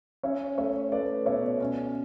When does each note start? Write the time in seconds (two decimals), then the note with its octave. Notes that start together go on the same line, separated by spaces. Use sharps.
0.23 C#4 C#5 E5
0.58 A3 C#5 E5
0.92 A3 B4 D5
1.26 B2 C#5 E5
1.60 C#4